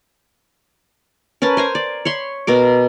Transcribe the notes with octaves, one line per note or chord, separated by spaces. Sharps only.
C#4 A#4 B4 A5
C5 G#5 A#5
D5
C#5 B5 C6
B2 A#4 D6